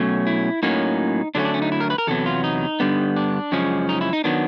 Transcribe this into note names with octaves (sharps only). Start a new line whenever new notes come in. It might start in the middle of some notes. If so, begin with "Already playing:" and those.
Already playing: B2 F#3 A3 C#4
E4
A2 F#3 A#3 C#4 D#4
D3 F#3 A3 C#4 D4
D4
C#4
D#4
E4
A#4
B4
A#4
E2 C3 F#3 B3 A4
F4
D#4
G2 D3 G3 B3
D4
F#2 C#3 F3 G#3 C#4
D#4
E4
D#4
D#3 F#3 B3 D4